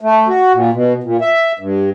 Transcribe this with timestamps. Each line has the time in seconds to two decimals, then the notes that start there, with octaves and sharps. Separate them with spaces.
0.01 A3
0.28 F#4
0.54 A#2
0.73 B2
1.04 A#2
1.21 E5
1.59 G2